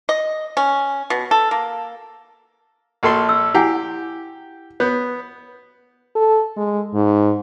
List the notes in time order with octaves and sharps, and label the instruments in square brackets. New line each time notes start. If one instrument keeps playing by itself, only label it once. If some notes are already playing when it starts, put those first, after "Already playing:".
[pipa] D#5
C#4
B2
A4
A#3
[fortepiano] A#1 A4 C6
[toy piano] E6
[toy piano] E4 F#5 G#5 [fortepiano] G4
[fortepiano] B3 [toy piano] C#5
[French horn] A4
G#3
G#2